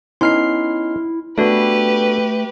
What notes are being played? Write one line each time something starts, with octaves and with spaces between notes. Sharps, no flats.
B3 C#4 D#4 E4 C6 F6 C7
A3 B3 D4 F#4 G4 A4 B4